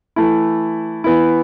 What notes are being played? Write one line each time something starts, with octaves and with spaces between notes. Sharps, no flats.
E3 A3 E4
E3 B3 E4